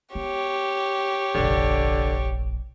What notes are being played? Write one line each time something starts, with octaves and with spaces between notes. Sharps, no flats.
B3 G4 C#5
F1 A#1 D3